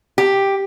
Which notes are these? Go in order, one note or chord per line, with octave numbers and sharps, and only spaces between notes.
G4